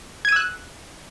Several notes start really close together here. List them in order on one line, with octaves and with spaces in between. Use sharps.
G#6 D#7 E6 F#6